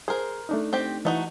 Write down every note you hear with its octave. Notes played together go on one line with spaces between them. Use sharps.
G#4 A#4 C5
A3 D4 D#4
C4 G4
E3 A3 D#4 F#4